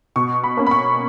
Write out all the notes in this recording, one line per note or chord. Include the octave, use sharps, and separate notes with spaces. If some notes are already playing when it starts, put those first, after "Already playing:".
B2 C#6
B5
A#3 C#4
B5
C#6